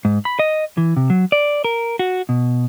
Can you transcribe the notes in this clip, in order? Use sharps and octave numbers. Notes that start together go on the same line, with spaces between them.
G#2
B5
D#5
E3
C3
F#3
D5
A#4
F#4
B2